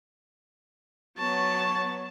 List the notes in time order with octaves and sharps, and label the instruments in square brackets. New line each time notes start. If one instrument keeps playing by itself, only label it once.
[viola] F#3 B3 [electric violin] A5 [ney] C#6